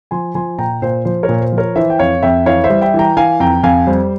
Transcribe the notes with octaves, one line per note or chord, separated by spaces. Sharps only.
F3 G#5 C6
F3 G#5 C6
A#2 G5 A#5
A#2 C5
F3 C5
A#4 C#5
A#2
C5
F3
A#4 C#5
E3 C5 E5
G5
F2 C#5 F5
F2 E5 G5
E3 C#5 F5
C5 E5
G3
E5 G5
E3
G5 A#5
E3 F5 G#5
F2 G5 A#5
F2 F5 G#5
G3 C5